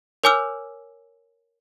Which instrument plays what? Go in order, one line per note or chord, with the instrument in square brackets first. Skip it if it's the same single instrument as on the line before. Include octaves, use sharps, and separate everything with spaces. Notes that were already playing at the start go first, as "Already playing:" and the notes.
[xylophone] A#4 C#5 G#5 D6 E6 F6